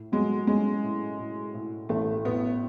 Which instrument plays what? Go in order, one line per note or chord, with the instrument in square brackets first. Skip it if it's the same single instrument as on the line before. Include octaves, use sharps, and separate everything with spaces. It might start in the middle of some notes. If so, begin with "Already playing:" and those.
Already playing: [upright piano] A2
[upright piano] F#3 [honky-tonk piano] G#3
[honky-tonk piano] G#3 [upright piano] C#4
[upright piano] A2
A2
A2
[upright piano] A1 [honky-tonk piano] A3
[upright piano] A2 [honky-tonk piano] B3